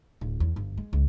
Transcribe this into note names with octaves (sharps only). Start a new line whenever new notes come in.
D1
E2
G1
G#3
C#2